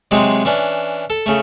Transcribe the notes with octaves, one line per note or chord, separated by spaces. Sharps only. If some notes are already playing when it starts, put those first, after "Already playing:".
C3 F#3 G#3 C4 D#4
E3 C#4 D4
A4
C#3 A3